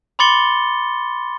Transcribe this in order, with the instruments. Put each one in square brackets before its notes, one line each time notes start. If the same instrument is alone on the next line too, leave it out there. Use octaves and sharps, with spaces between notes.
[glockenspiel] B5 C6 D6 A6 C#7 G7